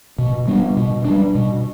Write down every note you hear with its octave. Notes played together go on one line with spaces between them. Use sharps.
B2
G3 B3 D4
B2
G3 B3 D4
B2